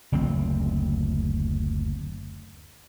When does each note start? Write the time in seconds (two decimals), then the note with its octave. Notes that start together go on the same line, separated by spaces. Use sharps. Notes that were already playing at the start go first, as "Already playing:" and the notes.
0.12 F#1 D2 F3 C4